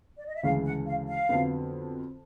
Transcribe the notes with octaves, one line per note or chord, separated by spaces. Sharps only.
D5
D#5
E5
D2 C#3 E3 G#3 C#4 F5
F#5
F5
F5
F2 D3 F#3 B3